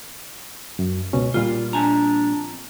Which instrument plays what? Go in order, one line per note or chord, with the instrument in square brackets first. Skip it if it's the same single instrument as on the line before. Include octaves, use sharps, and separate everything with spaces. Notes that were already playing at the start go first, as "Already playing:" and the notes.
[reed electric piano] F#2
C#2 B2 C#4
[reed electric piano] A#2 G3 A#3 [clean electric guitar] F4
[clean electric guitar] F2 G#5 A#5 [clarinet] D4